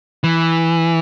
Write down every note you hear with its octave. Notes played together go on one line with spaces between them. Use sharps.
E3